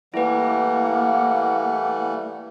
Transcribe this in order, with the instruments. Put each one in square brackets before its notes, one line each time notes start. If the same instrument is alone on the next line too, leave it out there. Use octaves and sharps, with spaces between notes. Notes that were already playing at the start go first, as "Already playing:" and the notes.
[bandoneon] E3 G3 A3 [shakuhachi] A#3 [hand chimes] E4 B4 [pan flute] F#5